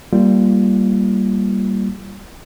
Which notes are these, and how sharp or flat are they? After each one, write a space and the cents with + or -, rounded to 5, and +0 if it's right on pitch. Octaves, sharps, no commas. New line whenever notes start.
G3 -5 A#3 +0 F4 -20